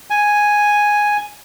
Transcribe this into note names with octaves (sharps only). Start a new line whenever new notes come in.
G#5